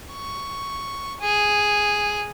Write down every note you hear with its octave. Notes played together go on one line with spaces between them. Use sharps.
C#6
G#4